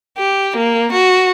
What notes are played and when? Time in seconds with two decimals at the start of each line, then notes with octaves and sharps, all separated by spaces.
0.18 G4
0.56 A#3
0.92 F#4